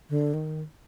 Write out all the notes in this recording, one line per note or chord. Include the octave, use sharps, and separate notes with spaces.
D3
D#3